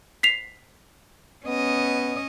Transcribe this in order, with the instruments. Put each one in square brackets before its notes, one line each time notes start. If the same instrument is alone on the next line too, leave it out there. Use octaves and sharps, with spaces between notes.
[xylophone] B6 C7 F7
[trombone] B3 [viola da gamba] C#4 D#5